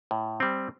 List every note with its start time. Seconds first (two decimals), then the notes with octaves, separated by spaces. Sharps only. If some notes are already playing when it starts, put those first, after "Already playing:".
0.11 A2
0.40 G3 C4